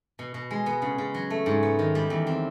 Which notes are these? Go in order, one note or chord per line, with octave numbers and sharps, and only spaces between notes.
B2
B2
G#3
B3
C#3
C#3
F#3
A3
G#2
B3
D#3
G3
E2
C4